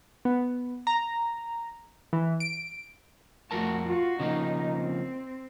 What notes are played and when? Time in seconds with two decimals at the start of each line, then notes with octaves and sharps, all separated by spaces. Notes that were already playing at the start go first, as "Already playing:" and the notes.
0.25 B3
0.87 A#5
2.13 E3
2.40 D7
3.51 F2 A3 F#4 A#4 A5
3.87 F4 F#4
4.20 C#3 F3 A#3 D#4
4.75 C4